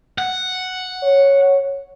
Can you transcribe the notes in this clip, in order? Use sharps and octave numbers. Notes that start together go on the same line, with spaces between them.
F#5
C#5